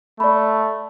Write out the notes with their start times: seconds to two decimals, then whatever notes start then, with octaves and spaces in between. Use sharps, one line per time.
0.20 A3 D5 B5